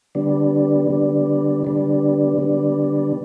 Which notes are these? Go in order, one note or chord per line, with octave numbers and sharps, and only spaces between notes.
D3 G3 B3 D4
D3 G3 B3 D4
D3 G3 B3 D4
D3 G3 B3 D4